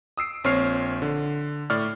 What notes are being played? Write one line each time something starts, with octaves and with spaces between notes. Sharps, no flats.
D#6 E6 C7 D7
A#1 C4 C#5 F6 C7
D3
A2 D5 C#6 F6